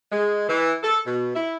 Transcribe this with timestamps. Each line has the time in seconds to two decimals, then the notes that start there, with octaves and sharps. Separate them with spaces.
0.11 G#3
0.48 E3
0.83 A4
1.05 B2
1.35 E4